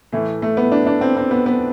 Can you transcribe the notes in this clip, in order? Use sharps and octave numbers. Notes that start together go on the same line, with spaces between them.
A2 E3 A3
A3
B3
D4
D4
C4
C4
B3
B3